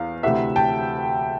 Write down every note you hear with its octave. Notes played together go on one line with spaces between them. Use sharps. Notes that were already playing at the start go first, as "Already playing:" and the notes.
Already playing: E2 F5
D2 C3 E3 E5 F#5
G5 A5